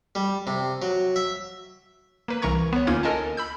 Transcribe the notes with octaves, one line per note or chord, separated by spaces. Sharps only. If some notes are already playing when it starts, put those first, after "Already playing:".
G3
C3
F#3
E5
A#3 B4
C2 E3 A#4 A#5 C#6 G#6
B3 C#5
D2 A#3 C#4 D#4 F4 G#6
A4 A#4 D#5 G#5 A5
B5 E6 G6